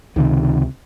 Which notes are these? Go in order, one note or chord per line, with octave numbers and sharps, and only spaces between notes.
C#2 C3 D#3